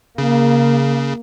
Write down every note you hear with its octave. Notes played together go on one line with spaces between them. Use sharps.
C#3 A#3